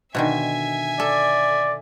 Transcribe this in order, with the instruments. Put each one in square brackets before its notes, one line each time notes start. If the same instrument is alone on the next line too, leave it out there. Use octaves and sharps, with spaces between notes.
[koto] B2 D3 D#3 [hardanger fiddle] E5 G#5
[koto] A4 [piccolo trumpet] D5